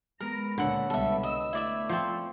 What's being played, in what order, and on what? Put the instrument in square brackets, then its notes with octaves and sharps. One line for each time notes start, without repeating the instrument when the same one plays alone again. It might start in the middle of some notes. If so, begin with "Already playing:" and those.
[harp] G#3 B3 [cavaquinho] A#4 [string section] A#5
[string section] C#2 A#2 [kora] D3 F#5 [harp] C#5 E6
[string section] C2 B2 G3 [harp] B3 [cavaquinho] A4 E5
[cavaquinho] D#5 [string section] E6
[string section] A3 [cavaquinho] E4 D5 E5
[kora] F3 C4 [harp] C6 C#6 E6